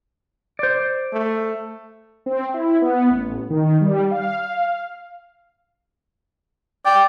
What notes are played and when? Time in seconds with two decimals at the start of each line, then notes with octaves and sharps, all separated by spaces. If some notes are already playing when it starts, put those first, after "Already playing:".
0.59 C5 D5
1.13 A3
2.26 C4
2.54 E4
2.81 B3
3.11 A1
3.50 D#3
3.81 G3
4.11 F5
6.85 D5 G5